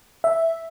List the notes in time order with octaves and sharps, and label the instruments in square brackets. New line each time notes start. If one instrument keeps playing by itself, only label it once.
[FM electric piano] E5